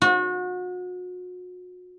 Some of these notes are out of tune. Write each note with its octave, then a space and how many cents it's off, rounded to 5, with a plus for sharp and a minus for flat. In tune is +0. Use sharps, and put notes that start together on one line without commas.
F#4 -35